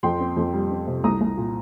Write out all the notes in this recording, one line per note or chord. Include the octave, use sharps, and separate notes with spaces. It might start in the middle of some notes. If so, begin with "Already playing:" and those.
F2 G5 C6
C4
F2
G3
C4
C3
C2 A#5 D#6
C2
A#2